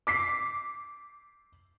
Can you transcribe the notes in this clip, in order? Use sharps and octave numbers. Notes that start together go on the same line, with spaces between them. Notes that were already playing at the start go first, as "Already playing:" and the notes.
D6 B6 C7